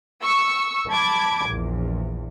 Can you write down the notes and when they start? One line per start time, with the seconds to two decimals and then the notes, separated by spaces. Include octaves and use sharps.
0.23 C#6 E6
0.88 A5 B5 D6 G#6
1.47 A#1 E2